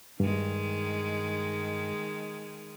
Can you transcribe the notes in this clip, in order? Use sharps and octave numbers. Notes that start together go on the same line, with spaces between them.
G2 D#3 G#3